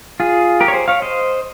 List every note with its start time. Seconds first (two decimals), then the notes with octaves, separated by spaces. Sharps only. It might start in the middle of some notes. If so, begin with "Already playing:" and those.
0.20 F4 G#4
0.61 G4 A#4
0.68 C#5
0.74 G#4 C5
0.88 C#5 F5
1.02 C5 D#5